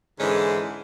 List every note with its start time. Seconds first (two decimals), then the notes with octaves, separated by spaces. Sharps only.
0.19 G#2 D3 E3 G#3 C#4